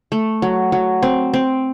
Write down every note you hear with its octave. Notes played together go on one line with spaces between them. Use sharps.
A3
F#3
F#3
C4
C4